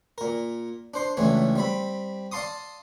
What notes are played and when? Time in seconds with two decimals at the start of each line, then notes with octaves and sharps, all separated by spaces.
0.18 A#2 A#4
0.94 D4 C5 C6
1.17 C#2 A2 E3 A3 D4
1.56 G3 C4 B5
2.32 D5 F5 A5 C6 D6 D#6